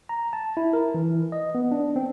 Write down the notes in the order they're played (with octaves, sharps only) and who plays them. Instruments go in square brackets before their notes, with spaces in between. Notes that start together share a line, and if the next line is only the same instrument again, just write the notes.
[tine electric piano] A#5
A5
E4
A#4
E3
D#5
B3
D4
C4